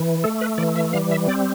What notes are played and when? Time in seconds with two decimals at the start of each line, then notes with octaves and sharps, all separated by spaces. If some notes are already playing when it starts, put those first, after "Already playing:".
Already playing: E3
0.24 A3 A4
0.41 B4
0.58 E3 D5
0.76 E5
0.93 G3 F5
1.11 E5
1.28 C4 D5